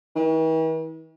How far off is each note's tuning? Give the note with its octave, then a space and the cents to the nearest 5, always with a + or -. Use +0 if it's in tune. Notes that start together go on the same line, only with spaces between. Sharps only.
E3 -45